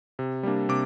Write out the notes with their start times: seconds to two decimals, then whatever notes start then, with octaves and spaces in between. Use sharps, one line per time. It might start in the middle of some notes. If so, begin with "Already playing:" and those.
0.19 C3
0.43 G3 A#3 D4
0.69 C3 D6